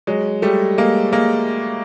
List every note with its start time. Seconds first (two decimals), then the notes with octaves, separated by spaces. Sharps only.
0.07 F#3 G#3
0.42 G3 A3
0.78 G#3 A#3
1.13 G#3 A#3